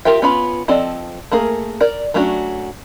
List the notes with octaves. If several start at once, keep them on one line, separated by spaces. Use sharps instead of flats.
F4 G4 A#4 E5 G5
B3 C#4 F4 B5
F3 C4 A4 D5 D#5
A3 A#3 G#4 A#4
A#4 D5
F#3 A3 C#4 D4 F#4